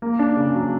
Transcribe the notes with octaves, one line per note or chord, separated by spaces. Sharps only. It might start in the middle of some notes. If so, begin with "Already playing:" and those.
A#3
D4
C#3
F#3